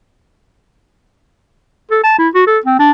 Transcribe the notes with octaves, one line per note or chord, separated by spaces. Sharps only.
A4
A5
E4
F#4
A4
C4
D4